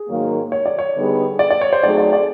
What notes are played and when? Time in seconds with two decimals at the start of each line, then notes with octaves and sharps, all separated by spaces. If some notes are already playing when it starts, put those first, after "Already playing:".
Already playing: G#4
0.08 G#2 D#3 F#3 A#3
0.52 C#5
0.66 D5
0.79 C#5
0.95 D3 G3 B3 D#4 G#4
1.39 D5
1.50 D5
1.61 C#5
1.73 C5
1.83 F#3 A3 C4 D#4 G#4 D5
1.98 D5
2.13 D5